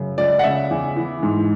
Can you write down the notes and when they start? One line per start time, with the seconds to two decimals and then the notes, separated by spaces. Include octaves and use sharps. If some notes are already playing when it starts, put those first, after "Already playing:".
Already playing: F#2 C#3
0.18 C#2 D5
0.39 F#5
0.44 C#3 E5
0.71 E2
0.96 E3
1.23 G#2